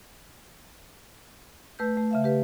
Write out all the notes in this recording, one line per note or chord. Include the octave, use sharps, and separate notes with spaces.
A3 B4 E6 G6
A3
C#3 E5 F5
G4 B4